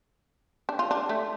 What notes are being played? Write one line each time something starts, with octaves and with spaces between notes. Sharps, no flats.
D4
F4
D4
A3